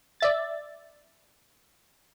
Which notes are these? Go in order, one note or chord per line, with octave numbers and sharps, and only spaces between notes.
D5 E5 A6